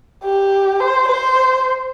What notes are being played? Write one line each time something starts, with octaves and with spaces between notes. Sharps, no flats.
G4
C5
C5